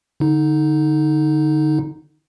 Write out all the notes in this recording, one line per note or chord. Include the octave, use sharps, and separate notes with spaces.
D3 D#4